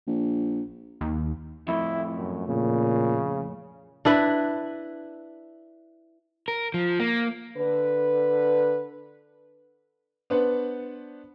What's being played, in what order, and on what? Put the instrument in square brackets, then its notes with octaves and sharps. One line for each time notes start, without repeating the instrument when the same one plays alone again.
[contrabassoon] A#1
[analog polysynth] D#2
[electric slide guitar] F2 A2 [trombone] E4
[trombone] F#2
[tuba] A#2 [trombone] C#3
[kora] D4 E4 B4
[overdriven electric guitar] A#4
F3
A#3
[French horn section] D3 B4
[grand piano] B3 D4 B4 C5 F#5